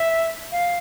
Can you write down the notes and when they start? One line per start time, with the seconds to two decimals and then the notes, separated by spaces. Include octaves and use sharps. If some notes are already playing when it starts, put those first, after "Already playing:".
Already playing: E5
0.52 F5